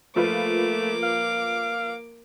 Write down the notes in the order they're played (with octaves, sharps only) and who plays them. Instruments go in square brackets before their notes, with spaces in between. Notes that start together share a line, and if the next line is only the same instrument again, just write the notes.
[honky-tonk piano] F3 F4 B4 [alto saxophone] A3 [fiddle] A#3 D6
[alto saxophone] F5